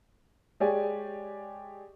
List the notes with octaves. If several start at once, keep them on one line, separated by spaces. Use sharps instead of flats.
G#3 G4 C#5 D5 G#5